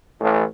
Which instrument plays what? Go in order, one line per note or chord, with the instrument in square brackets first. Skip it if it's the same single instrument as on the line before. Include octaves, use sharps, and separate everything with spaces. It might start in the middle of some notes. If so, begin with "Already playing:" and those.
[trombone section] A1